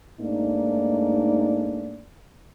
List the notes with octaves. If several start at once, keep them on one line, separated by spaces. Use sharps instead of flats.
G#2 A3 A#3 D4 D#4 D5